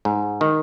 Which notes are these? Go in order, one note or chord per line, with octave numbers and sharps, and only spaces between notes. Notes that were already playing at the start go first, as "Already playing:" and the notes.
G#2
D#3